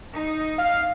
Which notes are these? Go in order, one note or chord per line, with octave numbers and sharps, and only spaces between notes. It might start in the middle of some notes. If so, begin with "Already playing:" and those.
D#4
F5